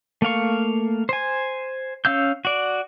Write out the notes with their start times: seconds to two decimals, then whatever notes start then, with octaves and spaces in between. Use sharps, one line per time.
0.22 A3 A#3 F5 C#6
1.09 C5 G#5
2.05 C#4 F5 E6 G6
2.45 F#4 D5